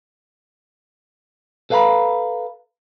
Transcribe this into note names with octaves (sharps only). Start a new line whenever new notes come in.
A4 B4 F5 G#5 A#5 B5